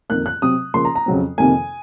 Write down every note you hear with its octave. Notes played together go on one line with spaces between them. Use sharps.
F2 D#3 A#3 F#6
F#6
C3 F#3 C4 D#6
C#3 F3 A#3 C6
A#5
A#5
F2 C#3 F#3 C4
F2 C3 D#3 A#3 G#5